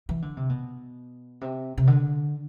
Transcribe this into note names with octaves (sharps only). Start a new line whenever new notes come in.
E3
D3
C3
B2
C3
C3
D3